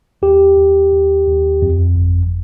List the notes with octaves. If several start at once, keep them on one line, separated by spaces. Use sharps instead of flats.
D#2 G4
D#2
D#2
D#2
F2
G1